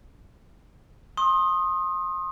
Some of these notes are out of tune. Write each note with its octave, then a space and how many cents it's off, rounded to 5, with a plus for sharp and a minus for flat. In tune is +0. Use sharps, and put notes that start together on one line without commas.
C6 +30 D#6 +0